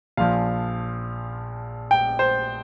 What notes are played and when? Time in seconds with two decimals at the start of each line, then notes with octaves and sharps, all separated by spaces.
0.17 A#1 A#2 F3 F5
1.91 G5
2.19 C5